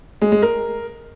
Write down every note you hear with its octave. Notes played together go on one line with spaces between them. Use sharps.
G#3
G#3
A#4